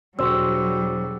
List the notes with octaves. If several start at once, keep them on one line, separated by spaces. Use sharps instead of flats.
E1 F#3 G3 F#4 C5 C#6 E6